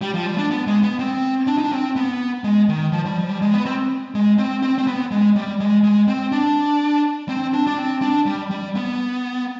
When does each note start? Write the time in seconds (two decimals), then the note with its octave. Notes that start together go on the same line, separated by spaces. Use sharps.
0.01 G3
0.14 F3
0.26 G3
0.38 D4
0.50 B3
0.67 G#3
0.83 B3
0.99 C4
1.47 D4
1.58 D#4
1.64 D4
1.72 C4
1.96 B3
2.44 G#3
2.68 D#3
2.92 F3
3.05 G3
3.17 F3
3.29 G3
3.42 G#3
3.54 B3
3.66 C4
4.15 G#3
4.38 C4
4.62 C4
4.78 C4
4.87 B3
5.11 G#3
5.36 G3
5.60 G#3
5.84 G#3
6.08 C4
6.32 D4
7.29 C4
7.53 D4
7.67 D4
7.78 C4
8.02 D4
8.26 G3
8.51 G3
8.75 B3